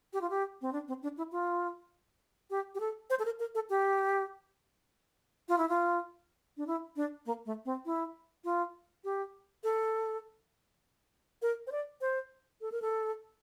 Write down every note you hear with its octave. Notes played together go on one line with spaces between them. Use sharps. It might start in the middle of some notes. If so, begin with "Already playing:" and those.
G4
F4
G4
C4
D4
C4
D4
E4
F4
G4
G4
A4
C5
A4
A#4
A#4
A4
G4
F4
E4
F4
D4
E4
D4
A#3
A3
C4
E4
F4
G4
A4
A#4
C5
D5
C5
A4
A#4
A4